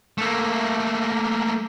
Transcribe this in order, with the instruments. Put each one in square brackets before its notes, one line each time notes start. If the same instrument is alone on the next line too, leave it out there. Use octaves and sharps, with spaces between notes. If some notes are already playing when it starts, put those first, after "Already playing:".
[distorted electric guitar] A3 A#3